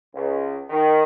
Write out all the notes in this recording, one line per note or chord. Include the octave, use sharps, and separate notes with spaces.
C#2
D#3